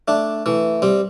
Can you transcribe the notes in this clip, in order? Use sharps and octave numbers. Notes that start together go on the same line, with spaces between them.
A3 D4
E3 A3
G3 C4